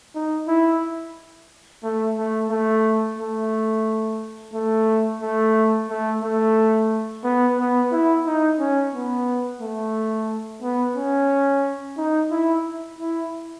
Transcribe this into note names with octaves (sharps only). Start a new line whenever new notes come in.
D#4
E4
A3
A3
A3
A3
A3
A3
A3
A3
B3
B3
E4
D#4
C#4
B3
A3
B3
C#4
D#4
E4
E4